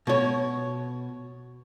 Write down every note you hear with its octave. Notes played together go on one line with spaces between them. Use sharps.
B2 C#5